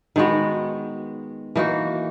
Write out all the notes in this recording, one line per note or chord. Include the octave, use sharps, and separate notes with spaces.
D#3 G#3 B3 F#4
E3 A#3 D#4 F#4